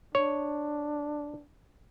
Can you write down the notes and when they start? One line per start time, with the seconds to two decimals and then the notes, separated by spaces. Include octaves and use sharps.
0.15 D4 C#5